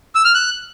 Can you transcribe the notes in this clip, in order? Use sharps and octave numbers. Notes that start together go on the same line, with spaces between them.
E6
F6
F#6